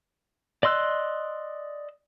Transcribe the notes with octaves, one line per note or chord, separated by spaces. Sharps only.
D5 D#5 C6 E6 F#6